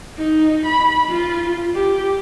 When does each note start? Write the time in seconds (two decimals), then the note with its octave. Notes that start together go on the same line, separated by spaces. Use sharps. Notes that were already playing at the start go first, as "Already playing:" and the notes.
0.17 D#4
0.66 B5
1.09 F4
1.74 G4